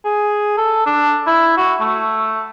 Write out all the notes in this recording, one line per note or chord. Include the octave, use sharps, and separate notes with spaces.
G#4
A4
D4
E4
F#4
A3